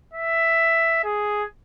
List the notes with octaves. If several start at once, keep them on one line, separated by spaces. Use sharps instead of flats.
E5
G#4